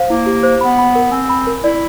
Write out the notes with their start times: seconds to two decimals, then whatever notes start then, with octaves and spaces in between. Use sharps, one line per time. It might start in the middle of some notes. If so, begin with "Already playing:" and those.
Already playing: C5 F5
0.10 A#3 E4
0.26 G4
0.43 C5
0.61 B3 B5
0.79 B5
0.95 A#4
1.11 C4 G#5
1.29 B5
1.47 A#4
1.63 E4 D5